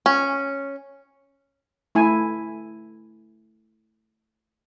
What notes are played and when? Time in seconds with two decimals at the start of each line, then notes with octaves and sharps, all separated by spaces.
0.06 C#4
1.95 A3 E4 G#5